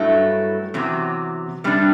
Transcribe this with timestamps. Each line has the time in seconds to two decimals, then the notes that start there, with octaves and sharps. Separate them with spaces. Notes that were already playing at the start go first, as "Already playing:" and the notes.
Already playing: G2 F#3 A3 E4
0.74 E2 C3 F#3
1.64 C3 G3 D4